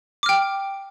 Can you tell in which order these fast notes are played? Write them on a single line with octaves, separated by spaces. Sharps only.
D6 F6 G5